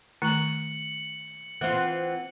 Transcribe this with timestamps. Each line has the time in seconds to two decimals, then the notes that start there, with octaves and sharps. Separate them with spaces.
0.22 D#3 A3 E4 C#7 F#7
1.61 E3 C4 F4 F#5